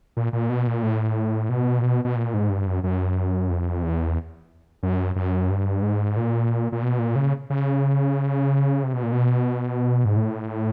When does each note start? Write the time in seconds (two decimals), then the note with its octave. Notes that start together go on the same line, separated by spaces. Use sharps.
0.17 A#2
0.33 A#2
0.50 B2
0.67 A#2
0.83 A2
1.49 B2
1.79 A#2
1.82 B2
2.05 B2
2.16 A#2
2.34 G#2
2.49 G2
2.67 F#2
2.84 F#2
3.50 F2
3.83 E2
4.83 F#2
5.16 F#2
5.50 G2
5.82 G#2
6.17 A#2
6.72 A#2
6.83 B2
6.99 A#2
7.16 C#3
7.50 C#3
8.83 C3
8.93 B2
9.03 A#2
9.12 B2
10.05 G#2
10.16 A2